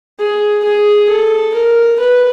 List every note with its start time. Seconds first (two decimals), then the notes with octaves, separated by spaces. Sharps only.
0.19 G#4
0.64 G#4
1.09 A4
1.54 A#4
1.99 B4